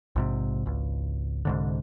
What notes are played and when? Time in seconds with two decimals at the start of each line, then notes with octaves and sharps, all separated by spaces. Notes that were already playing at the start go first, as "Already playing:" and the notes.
0.16 A#1 G#2 C3
0.66 G#1 C#2
1.45 C2 G#2 D3